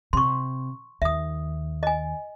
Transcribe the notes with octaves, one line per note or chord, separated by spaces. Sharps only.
C3 C6 C#6
D#2 E5 D#6
D#5 G#5